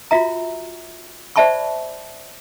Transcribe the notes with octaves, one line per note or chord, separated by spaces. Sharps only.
F4 F#4 E5 A#5
C5 D5 E5 A5 B5 C#6